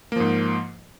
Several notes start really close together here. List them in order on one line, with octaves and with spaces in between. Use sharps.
A#3 F3 G#2